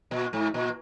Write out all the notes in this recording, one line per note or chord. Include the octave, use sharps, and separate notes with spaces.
A#2
G#2
A#2